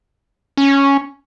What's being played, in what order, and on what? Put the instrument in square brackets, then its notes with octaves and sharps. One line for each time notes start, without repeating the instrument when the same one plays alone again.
[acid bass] C#4